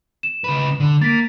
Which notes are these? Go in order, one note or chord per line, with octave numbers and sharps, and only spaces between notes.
E7
C#3 B4
D3
A#3 A6 B6 D7